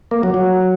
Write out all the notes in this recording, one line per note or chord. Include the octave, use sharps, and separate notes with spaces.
A#3
F#3
F#3